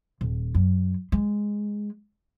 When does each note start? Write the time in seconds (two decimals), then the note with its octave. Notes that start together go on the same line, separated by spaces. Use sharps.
0.21 D#1
0.55 F#2
1.12 G#3